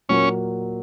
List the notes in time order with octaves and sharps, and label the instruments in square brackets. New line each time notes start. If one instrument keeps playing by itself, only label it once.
[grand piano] A#2 F#3 A#3 [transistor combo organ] C#4